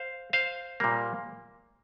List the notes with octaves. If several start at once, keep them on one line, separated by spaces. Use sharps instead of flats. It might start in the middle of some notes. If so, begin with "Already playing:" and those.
Already playing: C5 F5
C5 F5
A#2 G3 A#3